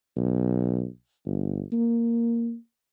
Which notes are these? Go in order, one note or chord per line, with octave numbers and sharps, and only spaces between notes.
B1
G1
A#3